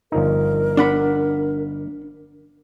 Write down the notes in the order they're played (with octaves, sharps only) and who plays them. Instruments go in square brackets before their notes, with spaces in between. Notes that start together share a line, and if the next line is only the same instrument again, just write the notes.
[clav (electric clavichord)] G1 F3 D#4 [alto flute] A#4
[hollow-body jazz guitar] D4 F#5 B5